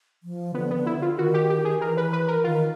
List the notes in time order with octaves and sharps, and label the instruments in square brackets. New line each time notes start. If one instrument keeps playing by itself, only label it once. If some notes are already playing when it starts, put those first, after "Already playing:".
[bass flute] F3
[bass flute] D3 [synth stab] B3
[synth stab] B3
[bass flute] D3
[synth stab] E4
[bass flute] D3
[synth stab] F4
[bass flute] D#3 [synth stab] F#4
[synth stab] G4
G4
G#4
[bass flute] E3 [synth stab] A#4
[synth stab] B4
B4
A#4
[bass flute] D#3 [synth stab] F4